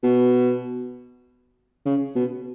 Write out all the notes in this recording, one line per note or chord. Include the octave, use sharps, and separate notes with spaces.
B2
C#3
B2